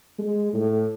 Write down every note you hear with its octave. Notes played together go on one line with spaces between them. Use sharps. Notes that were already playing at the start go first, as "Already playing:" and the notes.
G#3
A2